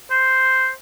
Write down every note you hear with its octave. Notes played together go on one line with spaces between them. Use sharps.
C5